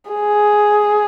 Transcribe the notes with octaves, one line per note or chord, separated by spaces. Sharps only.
G#4